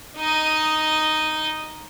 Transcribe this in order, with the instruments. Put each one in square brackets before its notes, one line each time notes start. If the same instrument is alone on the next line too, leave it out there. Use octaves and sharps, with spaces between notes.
[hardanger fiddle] D#4 D#5